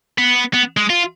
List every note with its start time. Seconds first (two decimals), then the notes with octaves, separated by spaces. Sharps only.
0.18 B3
0.54 B3
0.77 G#3
0.90 F4